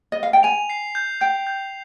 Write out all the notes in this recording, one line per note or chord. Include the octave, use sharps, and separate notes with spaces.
D#5
F5
G5
G#5 F7
C7
G6
G5 G6
G6